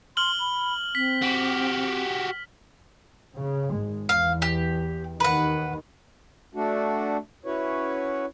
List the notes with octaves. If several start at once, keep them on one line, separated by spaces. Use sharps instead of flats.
C6 F6 F#7 G7
B5
C4 B6
F#4 G4
C#3
G#1 G#3
E2 F5
G4
D#2 D#3 B4 F#5
A3 D4 F#4
C#4 E4 F#4 B4 C#5